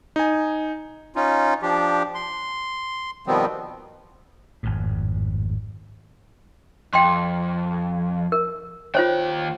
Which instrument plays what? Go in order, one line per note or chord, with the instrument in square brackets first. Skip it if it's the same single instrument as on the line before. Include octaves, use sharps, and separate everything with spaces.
[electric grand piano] D#4 G#5
[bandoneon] C#4 D#4 F4
F3 D4 G4
C6
B2 D#3 F3 G3 B3 C4
[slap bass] G#1 F2 A2
[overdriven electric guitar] F2 [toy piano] G5 C6
[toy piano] A#4
[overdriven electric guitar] D#2 G5 [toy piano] F4 C5 C#5